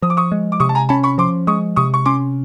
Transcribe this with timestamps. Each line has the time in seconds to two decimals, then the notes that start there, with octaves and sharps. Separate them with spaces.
0.02 F3 D#6
0.10 D6
0.17 C#6 D#6
0.32 G#3
0.52 D6
0.60 C3 C#6 D#6
0.69 A5
0.75 G#5 A#5
0.89 C#4 A5 B5
1.03 B5 C#6
1.18 F3 C6 D6
1.47 G#3 C#6 D#6
1.76 C3 C#6 D#6
1.94 C#6
2.05 C#4 C6 D6